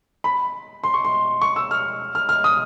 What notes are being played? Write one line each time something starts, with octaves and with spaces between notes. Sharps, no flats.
B5
C6
C#6
C6
C#6
E6
F6
F6
F6
D#6